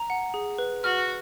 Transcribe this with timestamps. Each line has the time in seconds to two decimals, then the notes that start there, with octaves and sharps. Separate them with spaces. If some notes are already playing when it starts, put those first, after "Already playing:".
Already playing: A#5
0.10 F#5
0.34 G#4
0.58 B4
0.84 F#4 F6